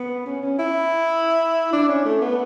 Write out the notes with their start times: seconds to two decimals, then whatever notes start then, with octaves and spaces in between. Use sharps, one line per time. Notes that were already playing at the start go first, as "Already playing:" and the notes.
Already playing: B3
0.26 C#4
0.42 C#4
0.59 E4
1.72 D4
1.88 C#4
2.05 A3
2.22 B3